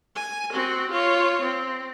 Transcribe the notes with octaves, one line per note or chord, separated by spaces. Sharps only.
G#5
C4 F#4
F4 C#5
C4